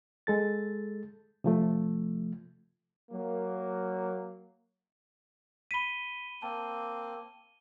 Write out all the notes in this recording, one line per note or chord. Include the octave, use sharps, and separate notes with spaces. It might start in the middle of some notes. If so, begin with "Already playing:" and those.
G#3 A4 A6
C3 F3 A3
F#3 A#3
B5 B6 D#7 G7
A#3 C4 A5